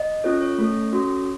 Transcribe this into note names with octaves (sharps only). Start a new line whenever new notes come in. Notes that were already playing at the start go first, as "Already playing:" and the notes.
Already playing: D#5
C#4 F4 A4 C#5
C#5
A3 C#4 A4
C#4 F#4 A4